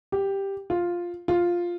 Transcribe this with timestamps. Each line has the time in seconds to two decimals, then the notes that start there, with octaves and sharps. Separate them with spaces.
0.12 G4
0.70 F4
1.28 F4